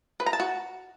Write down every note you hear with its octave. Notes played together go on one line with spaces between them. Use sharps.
B4
A#5
A5
F#4